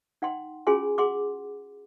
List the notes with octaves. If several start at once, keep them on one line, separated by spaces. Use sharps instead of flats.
D#4 F#5 G5 C6
C#4 F4 F#4 G#4 G#5 C6
G#4 F#5 C6 D6